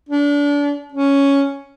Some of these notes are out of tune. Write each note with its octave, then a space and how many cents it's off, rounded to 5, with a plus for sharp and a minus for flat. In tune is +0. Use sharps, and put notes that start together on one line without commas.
D4 -30
C#4 +5